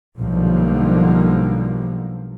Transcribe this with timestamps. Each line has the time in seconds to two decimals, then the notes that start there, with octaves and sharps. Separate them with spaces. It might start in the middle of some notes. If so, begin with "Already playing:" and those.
0.17 B1 D3 F3 G3 A#3